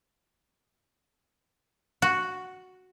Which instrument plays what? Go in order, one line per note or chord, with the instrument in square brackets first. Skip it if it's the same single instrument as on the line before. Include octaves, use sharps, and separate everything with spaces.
[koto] F#4